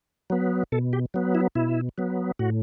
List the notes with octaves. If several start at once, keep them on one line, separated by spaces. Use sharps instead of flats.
F#3 B3
B2 A4
G4
F#3 B3
E4
B2 E4
F#3 B3
A2 F#4